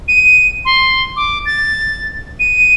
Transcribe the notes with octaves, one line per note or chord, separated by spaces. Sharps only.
D#7
C6
D6
A6
D#7